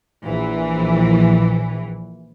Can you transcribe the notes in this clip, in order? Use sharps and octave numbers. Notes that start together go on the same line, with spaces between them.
A#1 E3